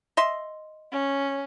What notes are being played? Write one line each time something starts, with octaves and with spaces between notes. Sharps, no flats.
D#5 E5 C6
C#4